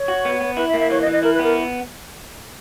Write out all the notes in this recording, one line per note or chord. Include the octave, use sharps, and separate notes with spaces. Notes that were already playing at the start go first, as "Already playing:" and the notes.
Already playing: C#5
F#4
B3
B3
E4 B4
E5
A#3
E5
E3 C#5
D#5
E3
D#5
E4 A#4
B4
B3 A#4